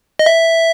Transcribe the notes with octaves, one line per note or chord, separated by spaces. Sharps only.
D#5
E5